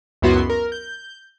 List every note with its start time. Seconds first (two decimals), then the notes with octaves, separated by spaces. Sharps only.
0.22 C#2 F#2 B3 E4 F#4 C6
0.50 A#4
0.72 G6